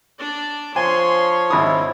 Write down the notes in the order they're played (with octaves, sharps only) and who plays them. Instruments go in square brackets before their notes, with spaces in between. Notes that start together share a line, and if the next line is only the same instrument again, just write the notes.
[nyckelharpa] D4 D5
[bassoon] F3 [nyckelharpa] C#5 [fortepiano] G#5 [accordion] C6
[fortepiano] G#1 C4 D#6 [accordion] E4